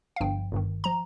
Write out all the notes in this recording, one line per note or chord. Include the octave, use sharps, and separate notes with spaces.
F5
G1 G2 F3 G5
G1 G2 D#3
F3 A#5